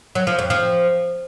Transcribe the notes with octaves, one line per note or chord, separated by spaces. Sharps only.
F#3
F3
F2
F3